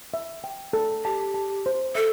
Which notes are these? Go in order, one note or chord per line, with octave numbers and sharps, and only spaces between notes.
E5
G5
A4
G4 A5
A5
C5
A4 E5